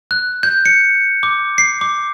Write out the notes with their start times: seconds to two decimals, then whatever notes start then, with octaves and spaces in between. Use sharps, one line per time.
0.11 F#6
0.43 G6
0.66 C#7
1.23 D6
1.58 C7
1.81 D6